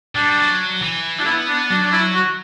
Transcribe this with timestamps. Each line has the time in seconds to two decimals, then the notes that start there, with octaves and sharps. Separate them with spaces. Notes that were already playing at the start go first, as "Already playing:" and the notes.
0.15 G3 D4
0.38 F#3
0.82 E3
1.19 D4
1.26 B3 E4
1.49 D4
1.70 F#3 D4
1.84 D4
1.92 E4
2.15 F#4